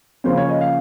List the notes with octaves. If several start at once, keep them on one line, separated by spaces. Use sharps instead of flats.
C#3 F3 A#3 C#4 C5
C#5
D#5
F5